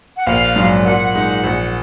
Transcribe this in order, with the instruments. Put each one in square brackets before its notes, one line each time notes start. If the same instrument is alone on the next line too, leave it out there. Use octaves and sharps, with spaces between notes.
[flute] F#5
[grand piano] A#1 [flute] F5
[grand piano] G#2 F#3 D4
[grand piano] A#2 [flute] F#5
[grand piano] G#3 D#4
A#1